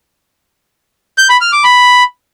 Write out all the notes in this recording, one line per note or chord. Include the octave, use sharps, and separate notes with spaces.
G6
B5
F6
D6
B5